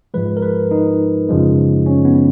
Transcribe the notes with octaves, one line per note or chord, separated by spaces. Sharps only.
G#2 F3 G#3 B4
A#4
B4
D#4
F#2 C#3 F3 G#3
C#4
B3